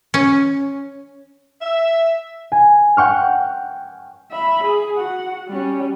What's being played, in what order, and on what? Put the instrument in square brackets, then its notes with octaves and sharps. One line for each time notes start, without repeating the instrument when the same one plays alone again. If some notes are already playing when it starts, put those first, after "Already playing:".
[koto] C#4
[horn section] E5
[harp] G#5
F#5 G5 C#6 F6
[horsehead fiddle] E5 B5
G#4
F#4 F#5
G3 C#4